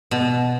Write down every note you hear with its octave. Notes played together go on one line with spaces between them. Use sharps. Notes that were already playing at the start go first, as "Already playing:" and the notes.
B2